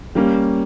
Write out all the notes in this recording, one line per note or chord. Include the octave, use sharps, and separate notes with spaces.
G3 A#3 C#4